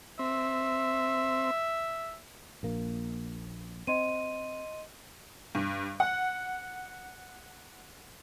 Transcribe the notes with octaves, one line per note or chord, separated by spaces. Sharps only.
C4 E5
A#1 A#3
C4 D#5 C6 D#7
G2
F#5